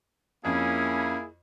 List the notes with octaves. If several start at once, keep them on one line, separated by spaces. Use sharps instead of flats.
F2 A#3 C#4 E4 G#4